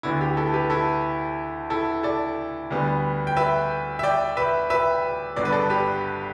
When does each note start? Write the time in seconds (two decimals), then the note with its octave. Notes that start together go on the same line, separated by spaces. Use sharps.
0.03 D2 D3 B3 E4
0.21 G4
0.37 E4 A4
0.54 G4 B4
0.70 E4 A4
1.70 E4 A4
2.03 A4 D5
2.70 D2 D3 G3 B3
3.27 G5
3.37 B4 E5
3.99 E5
4.03 D5 G5
4.37 B4 E5
4.70 B4 E5
5.36 G1 G2 D3 B3 D5
5.45 B4
5.52 A4 D5
5.70 G4 B4